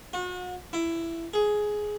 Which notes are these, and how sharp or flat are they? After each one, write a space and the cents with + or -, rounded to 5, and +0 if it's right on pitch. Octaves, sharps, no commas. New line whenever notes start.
F#4 -40
E4 +15
G#4 +10